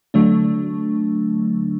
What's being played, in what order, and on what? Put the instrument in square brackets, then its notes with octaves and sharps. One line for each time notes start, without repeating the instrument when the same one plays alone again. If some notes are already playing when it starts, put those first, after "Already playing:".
[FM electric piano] D3 F#3 A3 D4